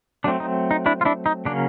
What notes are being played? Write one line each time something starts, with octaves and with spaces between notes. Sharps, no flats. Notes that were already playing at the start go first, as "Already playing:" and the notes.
F#3 A3 C4 D4
D#4
D#4
D4 E4
F4
D4 E4
D#4
C#3 F#3 A#3 C#4 D4